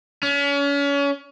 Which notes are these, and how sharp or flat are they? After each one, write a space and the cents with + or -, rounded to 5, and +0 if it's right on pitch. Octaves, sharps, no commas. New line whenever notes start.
C#4 +35